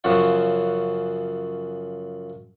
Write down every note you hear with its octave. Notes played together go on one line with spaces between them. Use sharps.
F#2 C#3 F3 C#5 F#5